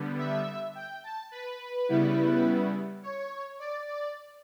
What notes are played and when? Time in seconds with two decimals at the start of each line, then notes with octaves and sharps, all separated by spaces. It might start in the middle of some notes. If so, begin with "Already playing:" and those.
Already playing: D3 G3 B3
0.18 E5
0.75 G5
1.04 A5
1.31 B4
1.89 C#3 G3 B3 E4
3.03 C#5
3.59 D5
3.88 D5